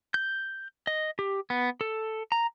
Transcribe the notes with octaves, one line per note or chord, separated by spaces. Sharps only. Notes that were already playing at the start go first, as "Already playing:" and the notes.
G6
D#5
G4
B3
A4
A#5